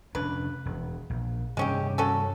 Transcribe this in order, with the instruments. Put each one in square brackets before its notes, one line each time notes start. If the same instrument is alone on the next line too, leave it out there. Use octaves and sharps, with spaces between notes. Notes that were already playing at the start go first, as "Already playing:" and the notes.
[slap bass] F1 C#4 D4 [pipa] B4
[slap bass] E1
A#1
[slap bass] G2 C3 D#3 [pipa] G#3 C#4 G4
[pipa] F#3 C#4 A4